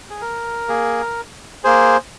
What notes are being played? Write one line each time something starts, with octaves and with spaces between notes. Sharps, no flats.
G#4
A#4
A#3 G#4
A#3 G#4 C5